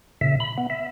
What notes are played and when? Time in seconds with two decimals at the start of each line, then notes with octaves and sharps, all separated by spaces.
0.21 A#2 C#3 E5
0.40 B5
0.58 B3
0.70 E5